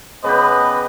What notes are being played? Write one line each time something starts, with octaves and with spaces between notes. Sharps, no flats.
C#3 B3 G4 B4 D#5